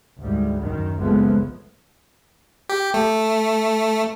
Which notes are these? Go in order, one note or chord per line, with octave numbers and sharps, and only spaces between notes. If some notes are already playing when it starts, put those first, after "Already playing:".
D2 G#2 G3
F#2 D#3
F#1 C#2 F3 G#3 A3 B3
G4
A3